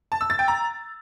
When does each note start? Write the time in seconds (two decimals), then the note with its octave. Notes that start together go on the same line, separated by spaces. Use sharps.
0.12 A5
0.21 E6
0.30 A6
0.39 G5
0.48 A#5